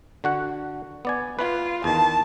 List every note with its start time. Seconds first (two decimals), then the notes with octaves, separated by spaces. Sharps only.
0.24 D3 F#4 F#5
1.05 B3 D5 G#5
1.39 F4 B4
1.84 E2 D#3 A5